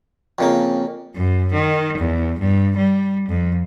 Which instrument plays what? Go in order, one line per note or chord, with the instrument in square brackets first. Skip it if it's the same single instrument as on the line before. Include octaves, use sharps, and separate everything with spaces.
[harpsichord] F2 C#3 A#3 [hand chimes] C4 A#4 G5
[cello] F#2
D#3
E2
G2
G3
F2